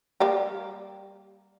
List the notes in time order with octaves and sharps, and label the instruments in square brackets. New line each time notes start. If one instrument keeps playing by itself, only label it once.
[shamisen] G3 A#3 G4